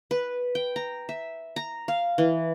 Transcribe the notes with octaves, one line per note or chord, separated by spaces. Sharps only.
B4
G5
A#5
E5
A#5
F5
E3